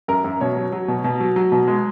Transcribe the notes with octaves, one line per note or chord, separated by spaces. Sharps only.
F#2 A#4
F#2
B2 C#5
F#3
F#3
B2
B2
F#3
F#3
B2
G#3